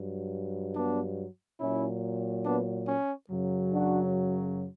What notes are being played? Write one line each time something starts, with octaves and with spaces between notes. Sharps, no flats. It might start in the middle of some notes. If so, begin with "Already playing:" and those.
Already playing: G2 F#3
B3 D4
A#2 F#3 C#4 E4
B3 D4
C#4
F#2 C#3 F#3
D4 F#4